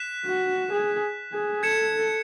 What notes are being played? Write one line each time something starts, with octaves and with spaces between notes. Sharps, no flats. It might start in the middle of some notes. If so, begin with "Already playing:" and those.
Already playing: F#6 B6 E7
F#4
G#4
G#4
A4 G#6 C#7 E7